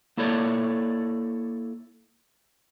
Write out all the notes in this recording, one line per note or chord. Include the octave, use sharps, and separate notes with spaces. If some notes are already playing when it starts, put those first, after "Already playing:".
A#3 E4 A4 C#5 D5